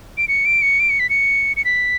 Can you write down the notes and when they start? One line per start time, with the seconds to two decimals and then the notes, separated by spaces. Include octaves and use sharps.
0.18 D7
0.28 C#7
0.46 D7
0.62 C#7
0.80 D7
0.90 C#7
1.00 B6
1.10 C#7
1.57 C#7
1.65 B6